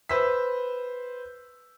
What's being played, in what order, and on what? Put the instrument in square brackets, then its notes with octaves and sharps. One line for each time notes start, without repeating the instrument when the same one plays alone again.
[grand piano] B4 C5 E6 B6